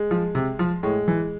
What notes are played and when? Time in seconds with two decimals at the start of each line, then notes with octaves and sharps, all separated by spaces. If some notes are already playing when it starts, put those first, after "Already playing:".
Already playing: G#3
0.11 F3
0.35 C3
0.59 F3
0.83 A2 G#3
1.08 E3